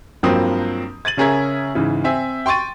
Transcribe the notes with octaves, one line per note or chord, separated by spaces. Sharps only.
G2 F3 F#3 A#3 C4 D#6
G#6 A6 D#7 F#7
C#3 C#4 G#4 A#4 E5 G#6
G#2 C#3 E3
C4 E5 G#5
G5 C6 C#6 A6 D#7